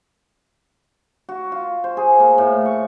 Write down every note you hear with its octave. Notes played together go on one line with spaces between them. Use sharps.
F#4
F4
C5
G#4
A#3
A2
C#6